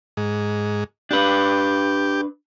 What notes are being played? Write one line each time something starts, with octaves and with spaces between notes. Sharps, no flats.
G#2
D4 G4 B4